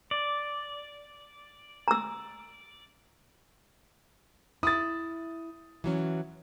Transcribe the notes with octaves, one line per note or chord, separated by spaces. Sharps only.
D5
A#5 E6
E4 D#6 A6
E3 F#3 C#4